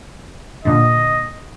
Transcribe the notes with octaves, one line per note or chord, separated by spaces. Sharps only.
A#2 D3 D#5